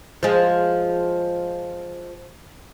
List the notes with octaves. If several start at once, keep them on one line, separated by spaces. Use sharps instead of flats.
F3 G#3